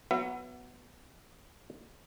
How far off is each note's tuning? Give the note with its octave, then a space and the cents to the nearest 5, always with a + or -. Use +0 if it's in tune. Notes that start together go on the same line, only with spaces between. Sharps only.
F#3 +0 B3 +5 E5 +35